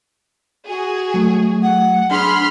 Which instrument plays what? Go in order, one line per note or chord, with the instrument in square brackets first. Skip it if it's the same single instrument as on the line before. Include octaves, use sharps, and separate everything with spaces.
[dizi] F#4 [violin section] G#4
[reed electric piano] F#3 A3
[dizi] F#5
[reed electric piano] D4 [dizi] G#4 [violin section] B5 C6 F6